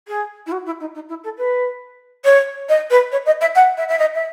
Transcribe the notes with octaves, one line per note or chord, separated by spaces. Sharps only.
G#4
E4
F#4
E4
D#4
D#4
E4
A4
B4
C#5
D#5
B4
C#5
D#5
E5
F#5
E5
E5
D#5
E5